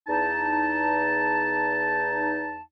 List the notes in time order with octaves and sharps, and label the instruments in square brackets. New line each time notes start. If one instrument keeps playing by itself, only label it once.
[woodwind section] E2 D#4 A5